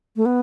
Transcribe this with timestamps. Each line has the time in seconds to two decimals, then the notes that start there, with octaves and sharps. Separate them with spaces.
0.16 A3
0.26 B3